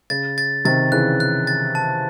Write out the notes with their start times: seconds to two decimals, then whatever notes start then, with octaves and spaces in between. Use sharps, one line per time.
0.10 C#3 A6
0.38 A6
0.65 C3 D#3 A6
0.92 C#3 E3 F#6
1.20 F#6
1.47 A6
1.75 A5